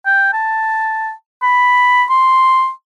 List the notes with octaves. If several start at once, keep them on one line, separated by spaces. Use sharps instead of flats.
G5
A5
B5
C6